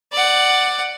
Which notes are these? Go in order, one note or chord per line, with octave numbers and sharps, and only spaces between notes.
D5 F#5